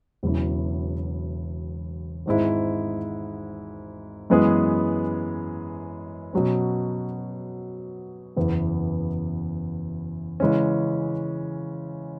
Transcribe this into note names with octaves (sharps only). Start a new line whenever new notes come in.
E1 E2 C#3 F#3 E4
G#1 G#2 G#3 E4
F#2 E3 G#3 B3 G#4
B2 F#3 C#4
F#1 E2 E3 B3
C#3 E3 G#3 C#4